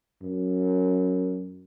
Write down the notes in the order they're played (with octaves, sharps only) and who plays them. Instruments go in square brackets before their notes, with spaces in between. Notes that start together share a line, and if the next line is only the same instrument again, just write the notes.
[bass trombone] F#2